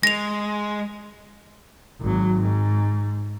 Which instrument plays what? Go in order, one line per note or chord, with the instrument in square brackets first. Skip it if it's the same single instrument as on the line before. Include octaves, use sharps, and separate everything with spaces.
[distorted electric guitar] G#3 [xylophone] A#6 F7
[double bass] G#1 F#3
G#2